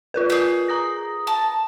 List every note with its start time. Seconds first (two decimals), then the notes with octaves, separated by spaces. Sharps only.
0.14 F4 A#4 B4
0.30 G#4 G6
0.68 A#5 D#6 A#6
1.27 A5